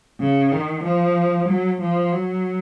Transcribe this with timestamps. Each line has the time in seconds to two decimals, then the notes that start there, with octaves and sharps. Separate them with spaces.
0.21 C#3
0.52 D#3
0.84 F3
1.49 F#3
1.81 F3
2.13 F#3